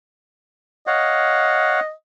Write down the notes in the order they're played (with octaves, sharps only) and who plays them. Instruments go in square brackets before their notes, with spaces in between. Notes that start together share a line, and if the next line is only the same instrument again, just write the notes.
[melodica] C#5 F5 F#5 [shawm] D#5